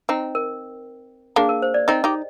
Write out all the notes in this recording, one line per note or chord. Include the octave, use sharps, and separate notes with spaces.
C4 D#4
A#4
A#3 D4 G#4
A#4
C5
D5
C4 D#4 D#5
D#4 G4